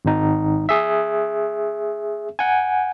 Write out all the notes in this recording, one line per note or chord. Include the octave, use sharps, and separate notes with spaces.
G#1 D#4
G#4 E5
F#5 G#5